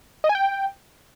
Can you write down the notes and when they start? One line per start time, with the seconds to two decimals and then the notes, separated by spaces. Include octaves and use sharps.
0.24 D#5
0.29 G#5
0.35 G5